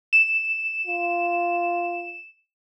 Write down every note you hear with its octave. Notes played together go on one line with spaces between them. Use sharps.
E7
F4